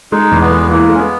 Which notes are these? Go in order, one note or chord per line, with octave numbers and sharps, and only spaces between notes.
G#3 D#4
E2
B3
G#3
E3 A#3
G#3
C#4
B3